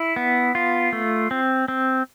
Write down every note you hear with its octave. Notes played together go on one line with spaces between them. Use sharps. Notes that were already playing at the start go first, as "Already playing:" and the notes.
Already playing: E4
B3
F4
A3
C4
C4